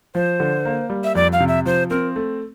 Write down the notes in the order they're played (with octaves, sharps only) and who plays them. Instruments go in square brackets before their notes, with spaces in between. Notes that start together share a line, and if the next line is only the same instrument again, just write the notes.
[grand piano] F3 [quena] C5
[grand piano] D3
A#3
G3
[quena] E5
[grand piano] F2 [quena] D5
[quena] F5
[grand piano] C3
[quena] E5
[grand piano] F3 [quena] C5
[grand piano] C4 [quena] A#4
[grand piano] A3